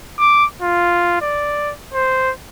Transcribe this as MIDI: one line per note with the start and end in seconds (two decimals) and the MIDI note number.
0.19 0.45 86
0.61 1.17 65
1.21 1.72 74
1.93 2.31 72